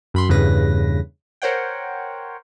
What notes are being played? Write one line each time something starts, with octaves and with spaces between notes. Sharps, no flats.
F#2 B5 C6
E2 G2 C#3 B4 A#6
A#4 C5 C#5 F#5 G5